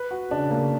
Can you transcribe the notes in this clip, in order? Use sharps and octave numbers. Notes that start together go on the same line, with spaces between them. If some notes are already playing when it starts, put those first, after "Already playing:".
Already playing: B4
F#4
C#3 D4
A#3